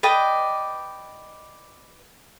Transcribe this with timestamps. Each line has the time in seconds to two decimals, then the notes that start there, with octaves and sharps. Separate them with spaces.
0.03 B4 D5 D#5 G5